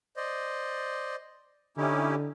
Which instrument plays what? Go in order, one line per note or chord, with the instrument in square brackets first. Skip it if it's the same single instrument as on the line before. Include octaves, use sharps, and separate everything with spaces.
[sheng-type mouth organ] C5 D5 D#5
[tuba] D3 [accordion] C#4 E4 G4 [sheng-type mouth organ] D#4